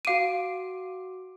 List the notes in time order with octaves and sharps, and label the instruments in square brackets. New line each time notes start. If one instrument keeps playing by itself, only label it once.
[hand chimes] F#4 D6 D7 [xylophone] F5 D#7